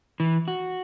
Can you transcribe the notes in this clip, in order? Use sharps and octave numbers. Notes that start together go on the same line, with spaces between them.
E3
F#4